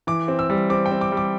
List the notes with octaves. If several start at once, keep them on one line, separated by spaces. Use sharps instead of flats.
E3 D6
C4
E6
G3
C4 D6
G5
C4
D6
G3
D6